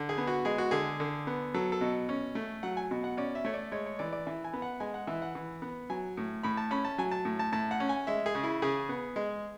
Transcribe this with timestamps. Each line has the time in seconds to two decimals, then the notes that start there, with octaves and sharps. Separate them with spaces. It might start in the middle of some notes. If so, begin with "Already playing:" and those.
Already playing: D3
0.09 G#4
0.18 B3
0.27 F#4
0.45 G#3 G#4
0.58 F#4
0.71 D3 G#4
1.00 D3
1.27 B3
1.54 F#3 A4
1.72 A4
1.81 B2
2.09 C#4
2.35 A3
2.63 F#3 F#5
2.77 G#5
2.91 B2
3.04 F#5
3.17 C#4 D5
3.35 E5
3.45 A3 C#5
3.54 D5
3.72 G#3 C#5
3.86 C#5
3.99 E3 D5
4.13 D5
4.27 E3 E5
4.44 G#5
4.53 B3
4.62 F#5
4.80 G#3 G#5
4.94 F#5
5.07 E3 E5
5.22 F#5
5.35 E3
5.62 B3
5.90 F#3 G#5
6.17 A2
6.43 A2 B5
6.57 A5
6.71 C#4 B5
6.85 A5
6.98 F#3 G#5
7.11 A5
7.25 A2
7.39 A5
7.52 A2 A5
7.71 F#5
7.80 C#4
7.89 G#5
8.07 G#3 E5
8.26 G#4
8.35 C#3
8.44 E4
8.62 C#3 G#4
8.89 B3
9.16 G#3